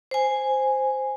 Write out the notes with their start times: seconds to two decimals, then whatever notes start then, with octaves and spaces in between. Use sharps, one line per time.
0.11 C5 G#5